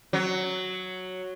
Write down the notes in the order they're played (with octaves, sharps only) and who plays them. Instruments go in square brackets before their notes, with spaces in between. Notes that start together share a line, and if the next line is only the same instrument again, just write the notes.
[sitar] F#3